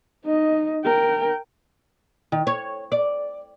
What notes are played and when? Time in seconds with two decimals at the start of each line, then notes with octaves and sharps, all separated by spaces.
0.24 D#4 D#5
0.84 A#4 G5
2.32 D#3
2.47 C#5
2.92 D5